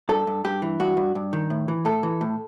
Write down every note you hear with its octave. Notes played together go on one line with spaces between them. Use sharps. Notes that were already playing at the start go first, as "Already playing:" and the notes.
G2 A4
G2
G2 G4
E3
G2 F#4
G2
G2
D#3
A2
E3
A2 A4
E3
A2